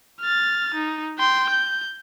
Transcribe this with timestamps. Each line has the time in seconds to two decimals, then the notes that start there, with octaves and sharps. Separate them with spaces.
0.21 F6 A6
0.75 D#4
1.19 G5 C6
1.50 G6